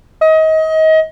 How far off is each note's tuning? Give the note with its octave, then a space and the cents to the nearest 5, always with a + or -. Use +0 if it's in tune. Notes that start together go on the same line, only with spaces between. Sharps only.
D#5 +30